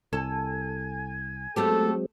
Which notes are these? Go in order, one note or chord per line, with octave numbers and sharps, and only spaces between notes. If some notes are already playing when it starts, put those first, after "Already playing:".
C2 A4 G#5
F#3 G#3 A3 B3 C4 G4 A4